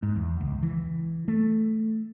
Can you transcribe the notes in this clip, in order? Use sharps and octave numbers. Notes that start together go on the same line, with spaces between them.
G#2
E2
C#2
E3
A3